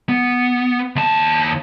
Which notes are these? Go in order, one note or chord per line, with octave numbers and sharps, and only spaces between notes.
B3
D#2 A5